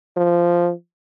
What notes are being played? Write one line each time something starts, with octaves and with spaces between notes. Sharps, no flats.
F3